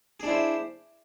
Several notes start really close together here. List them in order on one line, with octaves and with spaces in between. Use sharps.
G#4 D4 E4 C5